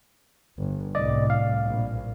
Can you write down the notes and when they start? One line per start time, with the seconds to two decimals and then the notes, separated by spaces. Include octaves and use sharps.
0.58 G1
0.95 C2 A2 D5 D#5
1.30 F5
1.66 A#1